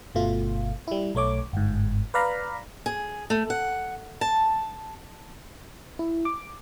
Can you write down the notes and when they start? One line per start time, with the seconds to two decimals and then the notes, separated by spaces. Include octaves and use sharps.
0.15 G1 B2 A3 F4
0.87 G3 E4
1.15 B1 A3 C#5 D6
1.53 G1 G#2
2.14 B4 D5 F5 A#5 B5
2.86 G#4
3.30 A3
3.50 F#5
4.21 A5
5.99 E4
6.25 D6